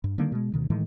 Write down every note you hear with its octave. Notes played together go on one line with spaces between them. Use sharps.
G2
D3 D#3 G3 A#3
B2 G#3
D2 B2 D#3
A2 D#3 E3 G#3